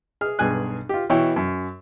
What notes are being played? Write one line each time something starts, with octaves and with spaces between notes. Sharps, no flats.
G#4 F6
B1 G2 G#4 G#5 F#6
F4 G4
B2 E3 E4 C#5 G5
F#2